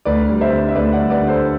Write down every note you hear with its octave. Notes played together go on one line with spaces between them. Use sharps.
D2 B4 D5
G3
C5 E5
D3
E5
D2 B4 D5
D5 F#5
G3
B4 D5
D3
A4 C5